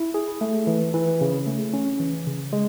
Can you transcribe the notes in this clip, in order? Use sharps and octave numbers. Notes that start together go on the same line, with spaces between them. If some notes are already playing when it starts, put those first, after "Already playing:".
Already playing: E4
G#4
A3
E3
E3
C#3
A3
C#4
E3
C#3
G#3